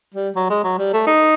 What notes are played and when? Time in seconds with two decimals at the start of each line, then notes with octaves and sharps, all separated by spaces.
0.14 G3
0.35 F#3
0.50 G#3
0.64 F#3
0.78 G3
0.93 A3
1.07 D#4